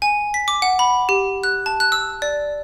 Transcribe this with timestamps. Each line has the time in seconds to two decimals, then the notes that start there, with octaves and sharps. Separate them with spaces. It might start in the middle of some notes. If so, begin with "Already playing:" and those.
0.02 G#5
0.34 B6
0.48 D6
0.62 F#5
0.79 B5
1.09 G4
1.43 F#6
1.66 A5
1.80 F#6
1.92 E6
2.22 D5